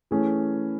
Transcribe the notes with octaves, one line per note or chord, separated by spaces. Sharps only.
E3 A3 C#4 G#4